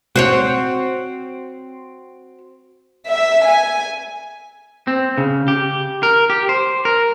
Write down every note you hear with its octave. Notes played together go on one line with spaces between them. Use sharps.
C4 F#4 C5 C#5
E5
G#5
C4
C#3
G4
A#4
G4
C5
A#4